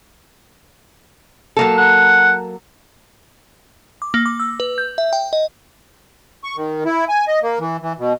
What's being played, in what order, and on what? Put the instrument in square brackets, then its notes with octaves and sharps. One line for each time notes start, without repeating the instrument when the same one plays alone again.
[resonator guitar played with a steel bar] F#3 A#3 A4
[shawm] F#5
[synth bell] D6
A#3
D6
E6
B4
G6
E5
G5
D#5
[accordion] C#6
D#3
E4
G#5
D#5
A#3
E3
E3
B2